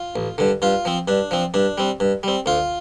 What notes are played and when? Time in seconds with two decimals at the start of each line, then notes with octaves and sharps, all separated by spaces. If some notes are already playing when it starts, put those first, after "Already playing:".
Already playing: F4
0.16 A1
0.38 G2 D3
0.62 G2 F4
0.85 F3 C4
1.08 G2 D4
1.31 F3 C4
1.54 G2 D4
1.78 G3 C4
2.00 G2
2.23 G3 C4
2.46 D2 F4